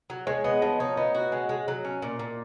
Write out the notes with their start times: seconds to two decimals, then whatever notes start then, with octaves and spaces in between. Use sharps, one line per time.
0.10 F#3
0.27 G#3 C#5
0.44 B3 D#5
0.62 F3 D#5
0.79 D#4 C#5
0.97 B3 D#5
1.15 F#4
1.32 G#3
1.49 G#3
1.68 F#3
1.85 C#4
2.02 A#2
2.19 A#2